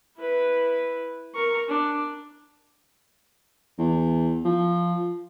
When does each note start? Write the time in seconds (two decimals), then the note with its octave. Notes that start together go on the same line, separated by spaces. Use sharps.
0.18 E4 B4
1.35 A#4 C#6
1.69 D4
3.78 E2
4.45 F3